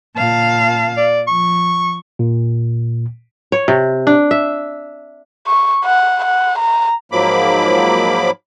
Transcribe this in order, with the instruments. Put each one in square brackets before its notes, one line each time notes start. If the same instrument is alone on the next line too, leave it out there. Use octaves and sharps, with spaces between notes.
[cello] A#2 F5 [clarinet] A5
[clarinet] D5
[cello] F3 [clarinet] C#6
[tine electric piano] A#2
[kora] C#5
C3
D4
E5
[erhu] C#6
F#5
F#5
A#5
[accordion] G#2 F3 F#3 A#3 B5 D6